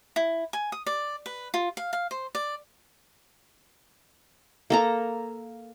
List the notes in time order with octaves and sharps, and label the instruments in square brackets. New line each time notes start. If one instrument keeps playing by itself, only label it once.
[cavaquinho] E4
G#5
D#6
D5
B4
F4
F5
F5
C5
D5
[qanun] A#3 A4 A#5